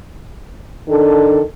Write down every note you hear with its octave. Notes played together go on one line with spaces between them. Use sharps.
D#3 D4 A4